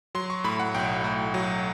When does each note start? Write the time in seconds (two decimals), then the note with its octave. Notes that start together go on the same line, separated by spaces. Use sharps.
0.15 F#3 C6
0.30 C#6
0.44 A2 B5
0.59 F#5
0.74 B1 G5
1.04 A2
1.34 F#3